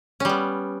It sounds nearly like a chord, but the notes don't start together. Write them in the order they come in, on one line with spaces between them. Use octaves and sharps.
C#4 G3 B3